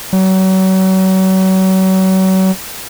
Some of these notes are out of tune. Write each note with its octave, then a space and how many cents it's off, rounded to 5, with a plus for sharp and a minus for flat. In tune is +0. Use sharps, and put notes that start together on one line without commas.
F#3 +35